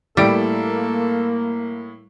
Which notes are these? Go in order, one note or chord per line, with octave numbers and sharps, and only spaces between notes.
A2 G3 A#3 E4 A4 D7